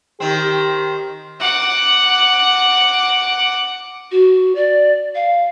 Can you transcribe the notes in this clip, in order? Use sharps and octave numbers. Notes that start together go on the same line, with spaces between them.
D#3 C4 G4
F#5 D6
F#4
D5
F5